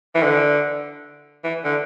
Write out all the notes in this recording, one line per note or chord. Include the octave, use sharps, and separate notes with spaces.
E3
D3
E3
D3